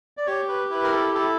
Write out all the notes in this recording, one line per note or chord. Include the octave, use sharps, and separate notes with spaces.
D5
G4 C#5
B4
E4 B4
A#4
A4
E4 A4